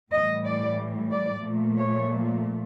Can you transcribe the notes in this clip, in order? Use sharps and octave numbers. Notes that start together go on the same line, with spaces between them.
A2 E3 G3 D#5
D5
D5
A#2 F3 A3
C#5